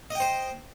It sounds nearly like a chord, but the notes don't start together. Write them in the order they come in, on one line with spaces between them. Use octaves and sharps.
D#5 G5 C5